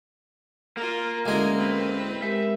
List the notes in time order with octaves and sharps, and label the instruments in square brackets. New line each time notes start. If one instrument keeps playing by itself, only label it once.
[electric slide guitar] A#3 [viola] F4 A#4
[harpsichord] D2 G#3 [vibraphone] C#4 E4 F5 [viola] A#4 G#5
[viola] C4 B4
[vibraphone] G#3 G4 A#4 [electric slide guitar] E5